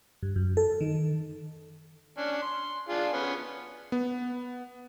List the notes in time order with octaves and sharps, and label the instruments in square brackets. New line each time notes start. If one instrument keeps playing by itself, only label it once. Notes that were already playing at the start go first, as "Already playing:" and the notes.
[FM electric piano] G2
F#2
A4
D#3
[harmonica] C#4 D4
C6
D4 F4 G#4
B3 C#4
[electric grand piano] B3